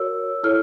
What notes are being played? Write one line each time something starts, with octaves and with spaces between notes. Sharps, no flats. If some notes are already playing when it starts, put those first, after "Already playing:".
Already playing: F#4 A#4 C#5 E6
E4 A4 C#5 F6